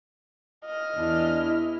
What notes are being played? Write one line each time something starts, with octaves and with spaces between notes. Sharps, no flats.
D#5 F6
E2 E3 D4
E4